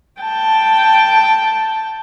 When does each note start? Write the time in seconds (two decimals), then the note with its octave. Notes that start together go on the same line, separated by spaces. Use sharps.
0.22 G5 A5